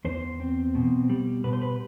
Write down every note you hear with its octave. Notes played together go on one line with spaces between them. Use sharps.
E2 C5
C4
B2
G3
B2 B4
C5
B4